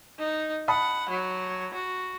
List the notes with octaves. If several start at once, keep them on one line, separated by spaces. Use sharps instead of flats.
D#4
F#5 A5 B5 D#6
F#3
F#4